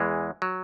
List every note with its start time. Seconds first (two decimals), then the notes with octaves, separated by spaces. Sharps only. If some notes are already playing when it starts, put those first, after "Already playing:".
Already playing: E2 E3 G#3
0.42 F#3